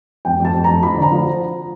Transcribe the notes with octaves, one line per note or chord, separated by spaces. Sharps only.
F2 G5
F2
A5
F2
F2 A#5
F3 B5
D3
A#5
F3